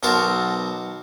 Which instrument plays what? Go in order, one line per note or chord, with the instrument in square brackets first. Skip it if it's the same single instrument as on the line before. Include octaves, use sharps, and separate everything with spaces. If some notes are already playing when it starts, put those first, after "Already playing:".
[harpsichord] B1 F#4 A#4 C5 A5